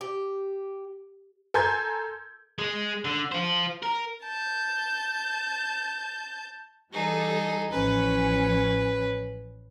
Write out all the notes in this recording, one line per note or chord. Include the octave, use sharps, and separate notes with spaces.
G4
A4 A#4 G#5 C6 G6 G#6
G#3
D3
F4 C5
A#4
A5 G6
E3 G3 D#4 G#4 A4
A1 F3 C#4 B4